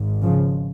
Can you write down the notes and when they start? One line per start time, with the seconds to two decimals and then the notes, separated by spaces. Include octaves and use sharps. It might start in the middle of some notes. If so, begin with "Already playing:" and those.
Already playing: G#1 G#2
0.23 C#3 F3